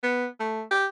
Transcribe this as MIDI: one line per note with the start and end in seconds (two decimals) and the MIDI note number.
0.03 0.27 59
0.40 0.63 57
0.71 0.86 67